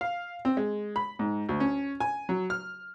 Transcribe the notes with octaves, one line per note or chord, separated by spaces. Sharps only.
F5
C4
G#3
B5
G#2
D2
C#4
G#5
F#3
F6